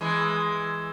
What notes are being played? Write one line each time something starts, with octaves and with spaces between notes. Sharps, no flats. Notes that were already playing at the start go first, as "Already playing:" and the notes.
E3 G#3